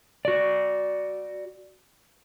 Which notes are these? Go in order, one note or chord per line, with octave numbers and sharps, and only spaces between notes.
F#4 D5